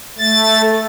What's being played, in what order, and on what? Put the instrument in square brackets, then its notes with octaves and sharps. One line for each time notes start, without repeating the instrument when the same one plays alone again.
[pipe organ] A3 A6